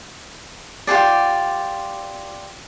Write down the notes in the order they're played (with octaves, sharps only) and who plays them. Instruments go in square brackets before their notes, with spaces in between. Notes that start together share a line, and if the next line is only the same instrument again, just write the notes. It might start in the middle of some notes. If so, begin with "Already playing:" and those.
[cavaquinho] F4 G4 G#4 D5